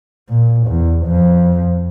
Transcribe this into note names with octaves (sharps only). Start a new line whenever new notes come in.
A#2
E2
F2